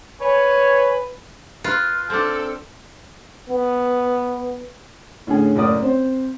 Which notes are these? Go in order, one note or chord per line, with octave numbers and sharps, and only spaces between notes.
B4 C#5 G#5
F4 B4
C4 D4 A4
B3
A2 D3 C#4 G#4
F#1 A2 A#4 D5 D#6
C4 C5